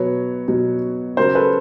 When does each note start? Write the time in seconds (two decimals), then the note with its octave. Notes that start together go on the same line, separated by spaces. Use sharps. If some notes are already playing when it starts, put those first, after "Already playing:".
Already playing: B2 F#3 B4 C#5
0.48 B2 F#3
1.17 C#3 F#3 A#4 C5
1.35 A4 B4